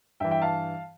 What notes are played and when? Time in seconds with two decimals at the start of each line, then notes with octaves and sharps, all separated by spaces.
0.20 G2 E3 E5 G5
0.31 E5 G5
0.42 F5 A5